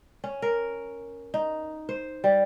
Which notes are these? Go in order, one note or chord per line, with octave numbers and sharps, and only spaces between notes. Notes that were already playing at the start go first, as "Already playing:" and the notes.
C#4
A#4
D#4
C5
G3